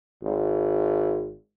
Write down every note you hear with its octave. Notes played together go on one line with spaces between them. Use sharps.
G#1